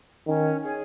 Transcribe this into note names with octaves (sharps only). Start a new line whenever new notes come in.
D#3 C#4
G#4 C#5 G#5